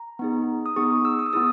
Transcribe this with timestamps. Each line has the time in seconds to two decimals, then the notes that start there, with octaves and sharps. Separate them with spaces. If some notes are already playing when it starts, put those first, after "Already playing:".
Already playing: A#5
0.19 B3 D#4 G#4
0.66 D#6
0.76 B3 D#4 G#4 C#6
0.91 D#6
1.05 E6
1.19 D#6
1.26 E6
1.33 B3 E4 G#4 D#6